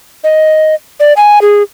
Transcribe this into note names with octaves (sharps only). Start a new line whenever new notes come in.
D#5
D5
G#5
G#4